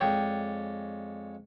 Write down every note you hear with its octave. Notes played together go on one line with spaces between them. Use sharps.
F2 G#3 C#5 D5 G5